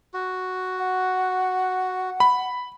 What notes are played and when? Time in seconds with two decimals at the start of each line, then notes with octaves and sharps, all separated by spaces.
0.14 F#4
0.79 F#5
2.20 B5